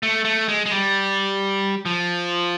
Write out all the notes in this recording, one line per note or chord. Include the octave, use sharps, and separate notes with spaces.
A3
A3
G#3
G#3
G3
F3